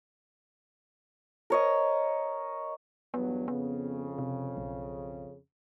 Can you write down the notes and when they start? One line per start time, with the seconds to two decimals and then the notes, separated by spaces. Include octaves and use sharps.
1.50 A#4 C#5 D#5
3.14 E2 G2 F#3 B3
3.48 F2 C#3 B3
4.18 C3
4.57 B1